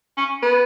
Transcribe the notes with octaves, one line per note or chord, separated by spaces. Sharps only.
C#4
B3